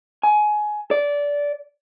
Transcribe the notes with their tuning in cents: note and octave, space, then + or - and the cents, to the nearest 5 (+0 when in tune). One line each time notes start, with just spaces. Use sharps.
G#5 +20
D5 -20